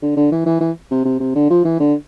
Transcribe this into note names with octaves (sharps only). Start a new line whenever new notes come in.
D3
D3
E3
E3
E3
C3
C3
C3
D3
F3
E3
D3